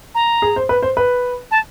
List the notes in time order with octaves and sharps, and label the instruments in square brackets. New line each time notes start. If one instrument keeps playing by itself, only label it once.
[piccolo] A#5
[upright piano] G#4
C5
B4
C5
B4
[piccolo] A5